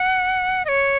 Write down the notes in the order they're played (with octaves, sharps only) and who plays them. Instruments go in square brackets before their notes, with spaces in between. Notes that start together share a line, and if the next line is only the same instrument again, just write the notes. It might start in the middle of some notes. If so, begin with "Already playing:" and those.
Already playing: [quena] F#5
D#5
C#5